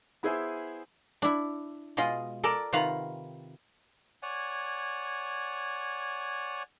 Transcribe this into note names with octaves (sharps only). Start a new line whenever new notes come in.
B3 E4 G#4 C5 E5 G#5
D4 E4
B2 G#3 F4 D#5
A4 A#4 D5 A5
C3 D#3 F4 B4 F5 F#5
C#5 D5 F#5 G#5